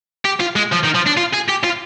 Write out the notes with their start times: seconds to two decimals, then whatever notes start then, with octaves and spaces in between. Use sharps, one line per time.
0.25 G4
0.40 F4
0.56 G#3
0.72 F3
0.83 D#3
0.94 F3
1.06 D4
1.17 F4
1.33 G#4
1.48 G4
1.63 F4